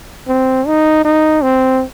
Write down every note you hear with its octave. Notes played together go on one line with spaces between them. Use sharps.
C4
D#4
D#4
C4